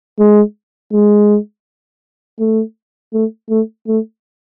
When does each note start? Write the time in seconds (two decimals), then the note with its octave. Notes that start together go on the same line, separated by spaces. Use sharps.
0.19 G#3
0.93 G#3
2.39 A3
3.13 A3
3.50 A3
3.88 A3